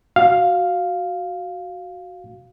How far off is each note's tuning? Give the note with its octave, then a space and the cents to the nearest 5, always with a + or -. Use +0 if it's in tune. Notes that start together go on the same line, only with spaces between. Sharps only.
F#4 +0 F5 +0